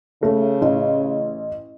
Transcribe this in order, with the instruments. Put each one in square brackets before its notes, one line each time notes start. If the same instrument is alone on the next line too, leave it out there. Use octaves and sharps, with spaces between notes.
[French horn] C#3 [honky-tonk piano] A3
[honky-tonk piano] A1